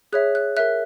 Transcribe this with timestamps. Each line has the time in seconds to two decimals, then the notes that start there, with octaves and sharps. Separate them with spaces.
0.13 G#4 C#5 E5 F#6
0.35 F#6
0.57 A#4 E5 F#6